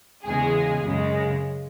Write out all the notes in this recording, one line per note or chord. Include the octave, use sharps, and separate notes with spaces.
E2 C#3 G#3 G#4
F#2 C#3 G#3